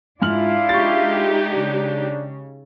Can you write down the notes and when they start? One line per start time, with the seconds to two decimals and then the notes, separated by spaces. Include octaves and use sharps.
0.22 G#2 D4 E4 F4 F5 F6 F#7
0.69 G#3 D#4 G4 C#6 A6
1.51 C#3 D4